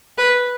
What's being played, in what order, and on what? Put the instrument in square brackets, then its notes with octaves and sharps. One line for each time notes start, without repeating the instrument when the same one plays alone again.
[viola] B4